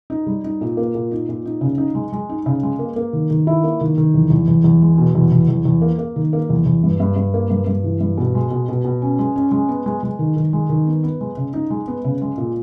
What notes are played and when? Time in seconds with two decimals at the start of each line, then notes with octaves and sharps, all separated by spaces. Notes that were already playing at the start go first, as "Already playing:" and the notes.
0.10 D#4
0.27 G3
0.44 D#4
0.61 A#2
0.77 A#3
0.95 A#2
1.11 D#4
1.29 A#2
1.45 D#4
1.61 C#3
1.78 D#4
1.95 G#3
2.12 G#3
2.29 D#4
2.46 C#3
2.63 G#3
2.79 A#3
2.96 A#3
3.13 D#3
3.30 D#3
3.47 E4
3.63 A#3
3.81 D#3
3.98 D#3
4.14 E2
4.30 E2
4.48 E2
4.64 E2
4.82 G#3
4.98 B2
5.15 E2
5.32 E2
5.49 E2
5.65 E2
5.82 A#3
5.99 A#3
6.16 D#3
6.33 A#3
6.50 E2
6.66 E2
6.83 G2
7.00 G2
7.16 G2
7.34 A#3
7.50 G2
7.67 G2
7.84 E3
8.00 G2
8.18 B2
8.35 G#3
8.51 B2
8.69 B2
8.84 B2
9.02 C#4
9.19 G#3
9.36 C#4
9.52 G#3
9.69 B3
9.86 G#3
10.03 G#3
10.19 D#3
10.36 D#3
10.53 G#3
10.69 D#3
10.87 B3
11.03 B3
11.21 G#3
11.37 C#3
11.54 D#4
11.70 G#3
11.88 B3
12.04 C#3
12.22 G#3
12.38 A#2